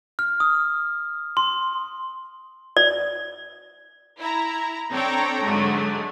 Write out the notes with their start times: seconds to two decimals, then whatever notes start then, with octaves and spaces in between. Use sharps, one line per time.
0.19 F6
0.40 D#6
1.37 C6
2.77 D5
4.18 E4 A#5
4.92 C4 D4 A4 C#5 G5 A#5
5.44 G#2 D3 F#3 G#3 A3